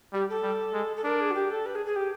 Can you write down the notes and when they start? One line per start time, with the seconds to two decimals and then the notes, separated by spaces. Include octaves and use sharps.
0.13 G3 G4
0.29 A4
0.43 G3
0.73 G#3
0.96 A4
1.04 D4 A#4
1.20 G#4
1.30 F#4
1.34 G4
1.50 A4
1.65 B4
1.75 G#4
1.85 G#4
1.95 G4